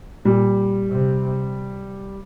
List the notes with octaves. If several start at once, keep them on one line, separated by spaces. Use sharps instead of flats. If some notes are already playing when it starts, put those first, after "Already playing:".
A#2 G3
C3